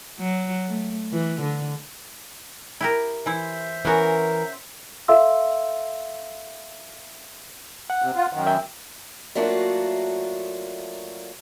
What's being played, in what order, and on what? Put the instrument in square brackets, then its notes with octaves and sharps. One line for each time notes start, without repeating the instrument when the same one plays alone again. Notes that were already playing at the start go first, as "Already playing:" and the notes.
[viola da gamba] F#3
A3
E3
D3
[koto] E4 G4 A#4
[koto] E3 E4 [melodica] C5 E5
[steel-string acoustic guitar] E3 A#4 [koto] B3 C#4 F#4
[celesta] A4 E5 F5 C6 E6
[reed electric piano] F#5
[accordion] C3
F4
F#2 D#3
[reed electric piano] E5 G5
[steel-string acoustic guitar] F#3 A3 A#3 D4 F4 F#4